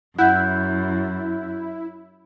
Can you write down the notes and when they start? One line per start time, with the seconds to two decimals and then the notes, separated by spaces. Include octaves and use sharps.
0.19 F#2 E4 F#5 F#6 G6